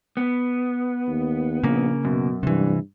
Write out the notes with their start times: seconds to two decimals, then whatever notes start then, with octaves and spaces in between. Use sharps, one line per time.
0.17 B3
1.08 D#2
1.64 A#1 C#3 A#3
2.05 F#2 B2
2.43 G2 C3 E3